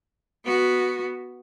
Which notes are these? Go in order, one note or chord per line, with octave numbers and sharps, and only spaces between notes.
B3 F#4